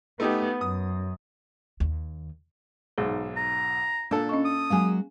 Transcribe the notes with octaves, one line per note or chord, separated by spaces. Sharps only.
A3 B3 D#4 G4
F#2 D#6
D#2
B1 G#2 G#4
A#5
A#2 D4 A4
C#4 D#5 C#6
D#6
F#3 G#3 A#3 F5 G#5